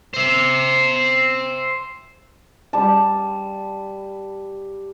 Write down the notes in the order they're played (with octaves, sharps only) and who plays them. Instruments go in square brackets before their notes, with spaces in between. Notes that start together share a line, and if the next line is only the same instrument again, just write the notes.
[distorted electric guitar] C5 E5
[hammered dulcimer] G3 A5